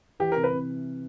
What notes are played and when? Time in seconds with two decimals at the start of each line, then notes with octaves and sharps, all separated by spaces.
0.20 E3 G4
0.32 C3 A#4
0.44 B4
0.52 C3